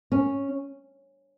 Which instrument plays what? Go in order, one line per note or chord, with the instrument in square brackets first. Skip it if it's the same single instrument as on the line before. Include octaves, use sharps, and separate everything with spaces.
[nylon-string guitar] C#4